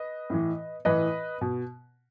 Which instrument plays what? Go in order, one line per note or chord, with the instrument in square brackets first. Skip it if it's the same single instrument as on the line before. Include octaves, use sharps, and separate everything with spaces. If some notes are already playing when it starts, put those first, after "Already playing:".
Already playing: [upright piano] B4 D#5
A2 E3
A2 E3 B4 D#5
B2